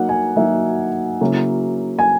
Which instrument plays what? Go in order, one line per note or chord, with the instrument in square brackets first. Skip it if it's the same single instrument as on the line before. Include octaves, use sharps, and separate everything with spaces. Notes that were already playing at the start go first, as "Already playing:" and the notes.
Already playing: [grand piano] F#3 A#3 D#4 [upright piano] F#5
[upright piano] G#5
[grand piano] F#3 A#3 D#4 [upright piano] E5
[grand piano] C#3 F#3 A#3 C#4 E4
[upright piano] G#5